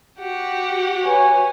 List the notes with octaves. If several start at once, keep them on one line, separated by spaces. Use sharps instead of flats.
F#4 G4 F#5
B4 C#5 G#5